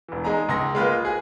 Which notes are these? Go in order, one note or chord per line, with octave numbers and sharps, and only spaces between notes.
E1 E3
G#3 D#4 G#5 A#5
C#2 C6 A#6
G#3 A#3 F4 B4
G#4 G#5